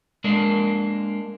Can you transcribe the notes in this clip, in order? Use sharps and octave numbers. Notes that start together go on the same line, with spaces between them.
G#3 A#3 D4 A#4